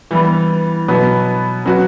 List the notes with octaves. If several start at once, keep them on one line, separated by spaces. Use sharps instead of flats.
E3 G3 B3
B2 F#3 B3
F#3 C#4 F#4 B4